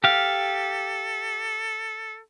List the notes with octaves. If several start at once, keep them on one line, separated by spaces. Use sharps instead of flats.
G4 A4 F5